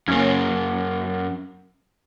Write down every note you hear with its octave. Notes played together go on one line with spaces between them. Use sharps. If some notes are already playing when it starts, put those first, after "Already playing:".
F#2 A#3 C#4